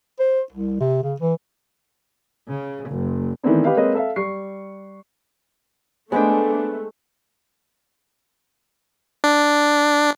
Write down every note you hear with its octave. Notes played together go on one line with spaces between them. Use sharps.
C5
C2
C3
C#3
E3
C#3
F#1
D#3 E3 A3 B3 C4 D4
G4 B4 D#5 F5
G#3 A#3 C4 B4 C#5 D#5
A4 E5 F5
G3 C#6 C7
G#3 A3 B3 D4 B4 C5 D#5 G5
D4